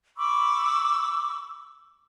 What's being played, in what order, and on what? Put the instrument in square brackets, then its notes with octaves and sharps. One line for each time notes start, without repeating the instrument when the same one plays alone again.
[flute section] B5 C#6 D6 E6